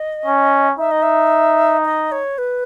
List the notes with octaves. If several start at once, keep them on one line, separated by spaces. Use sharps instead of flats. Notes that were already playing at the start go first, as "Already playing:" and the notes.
Already playing: D#5
C#4
D#4 E5
D#5
E5
D#5
C#5
B4